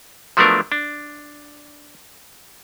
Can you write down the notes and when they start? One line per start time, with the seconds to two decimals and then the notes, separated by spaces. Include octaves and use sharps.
0.37 F3 F#3 A3 B3 D4 A#4
0.72 D4